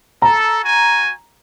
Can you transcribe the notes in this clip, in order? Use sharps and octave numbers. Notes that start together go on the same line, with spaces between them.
A4 A#5
F#4 G#5